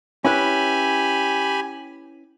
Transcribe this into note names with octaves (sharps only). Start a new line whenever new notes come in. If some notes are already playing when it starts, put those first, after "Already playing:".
C#4 E4 G4 B4 G#5 B5